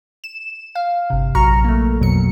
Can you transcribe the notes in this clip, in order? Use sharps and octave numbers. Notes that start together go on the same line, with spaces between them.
E7
F5
G1 C3
A#1 F#3 A#5 C#6 F6
A3 A#3
F2 B2 F#3 C#7